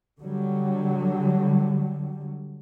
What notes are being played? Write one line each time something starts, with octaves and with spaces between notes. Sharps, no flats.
D3 F#3 G3